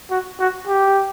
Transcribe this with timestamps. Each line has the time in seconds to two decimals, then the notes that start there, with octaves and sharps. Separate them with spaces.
0.10 F#4
0.39 F#4
0.67 G4